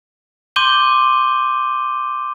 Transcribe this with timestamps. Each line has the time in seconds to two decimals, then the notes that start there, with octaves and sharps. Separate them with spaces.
0.56 C6 D6 G6 D#7 G7